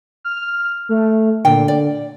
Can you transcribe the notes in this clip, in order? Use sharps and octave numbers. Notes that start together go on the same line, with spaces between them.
F6
A3
A#2 D3 G5
D5